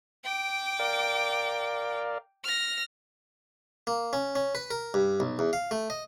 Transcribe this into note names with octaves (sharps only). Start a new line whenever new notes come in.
G5 D6
A#4 D5 F5
F6 A#6
A#3
C#4
C#4
B4
A#4
G2
B1
E2
F5
A3
D#5